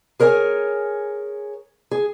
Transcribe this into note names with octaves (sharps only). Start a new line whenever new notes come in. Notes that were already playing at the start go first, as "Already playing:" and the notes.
G#4 A#4 C#5 E5 G#5
G#4